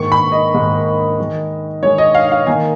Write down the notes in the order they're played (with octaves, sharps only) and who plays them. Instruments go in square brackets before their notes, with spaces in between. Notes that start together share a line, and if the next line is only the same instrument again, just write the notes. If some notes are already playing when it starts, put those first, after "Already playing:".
Already playing: [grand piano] G#2 D#3 A#3 [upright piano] C#6
[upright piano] B5
D#5
[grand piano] G#2 D#3 A#3
D#3 G#3 D#4
[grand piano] D#3 G#3 D#4 [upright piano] C#5
[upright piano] D#5
F5
F5
[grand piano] D#3 A#3 D#4 [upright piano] G#5